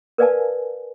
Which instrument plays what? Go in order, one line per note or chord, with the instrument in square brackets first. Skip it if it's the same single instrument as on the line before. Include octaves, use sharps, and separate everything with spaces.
[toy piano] A#4 B4 D5 F5 G#5 A5